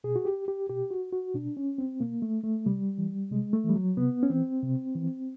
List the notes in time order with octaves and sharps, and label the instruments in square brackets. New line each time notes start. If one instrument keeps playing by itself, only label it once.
[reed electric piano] B2 G#4
F#4
G4
G4
B2 G4
F#4
F#4
B2 D4
C#4
C4
B2 A#3
A3
A3
C3 G3
E3
C3 G#3
A3
E3
G3
F#3
C3 B3
C#4
E3 C4
C3
E3